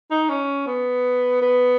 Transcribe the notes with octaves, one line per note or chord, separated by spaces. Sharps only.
D#4
C#4
B3
B3